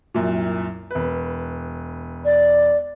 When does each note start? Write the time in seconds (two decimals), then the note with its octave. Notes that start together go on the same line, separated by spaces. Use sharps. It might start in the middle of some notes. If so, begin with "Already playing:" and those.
0.14 C2 F#2 A#2
0.91 E1 B4
2.25 D5